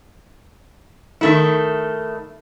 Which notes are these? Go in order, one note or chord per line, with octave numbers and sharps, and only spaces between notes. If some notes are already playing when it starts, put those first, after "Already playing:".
D#3 A3 E4